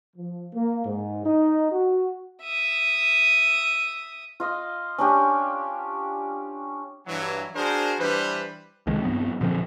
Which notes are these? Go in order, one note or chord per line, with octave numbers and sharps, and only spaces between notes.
F3
A#3
G#2
D#4
F#4
E5 D#6
F4 D#5
C#4 D4 G4
G2 E3 F#3
D4 F#4 G#4 A#4 C5
E3 G3 D4 B4 C5
C2 D#3 G#3
G2 F#3 B3 C4
A#2 D3 F3 C4